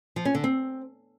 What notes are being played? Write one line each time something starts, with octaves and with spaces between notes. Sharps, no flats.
F3
C#4
D3
C4